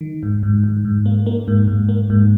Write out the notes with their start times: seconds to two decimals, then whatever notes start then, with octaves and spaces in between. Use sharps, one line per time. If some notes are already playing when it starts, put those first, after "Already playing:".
0.01 D#3
0.23 G#2
0.43 G#2
0.64 G#2
0.85 G#2
1.06 A#3
1.26 A#3
1.48 G#2
1.68 G#2
1.89 A#3
2.10 G#2